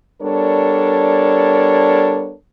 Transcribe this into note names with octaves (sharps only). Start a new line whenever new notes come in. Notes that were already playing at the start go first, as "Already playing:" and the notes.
G3 B3 D4 A4 A#4 C#5